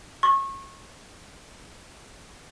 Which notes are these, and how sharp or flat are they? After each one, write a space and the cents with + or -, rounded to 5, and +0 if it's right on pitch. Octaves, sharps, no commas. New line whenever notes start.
C#6 -25